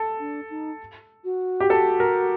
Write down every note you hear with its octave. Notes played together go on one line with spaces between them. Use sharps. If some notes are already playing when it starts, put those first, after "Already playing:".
Already playing: A4
D4
D#4
F#4
G4
A4
A#4